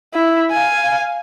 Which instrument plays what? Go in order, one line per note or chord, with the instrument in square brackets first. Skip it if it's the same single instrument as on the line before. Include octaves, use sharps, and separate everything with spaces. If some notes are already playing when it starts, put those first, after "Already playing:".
[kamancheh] E4
F5 G#5